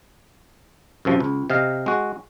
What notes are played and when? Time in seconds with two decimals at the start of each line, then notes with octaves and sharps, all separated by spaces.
1.05 F#2 C3 F3
1.20 C#2
1.50 C3 D#5 F5
1.86 G#3 F#4